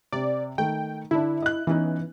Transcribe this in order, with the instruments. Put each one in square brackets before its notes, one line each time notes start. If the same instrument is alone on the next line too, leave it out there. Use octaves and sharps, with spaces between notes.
[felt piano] C3 [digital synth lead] D5
[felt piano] D#3 A3 [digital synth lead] G5
[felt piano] D3 D4 [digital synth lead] E4
[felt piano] D#5 F#6
[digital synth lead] E3 [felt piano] B3 C#4 D#4